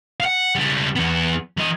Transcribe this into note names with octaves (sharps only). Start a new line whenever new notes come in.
F5 F#5
C#2 G3
E2 B3
E3 D#5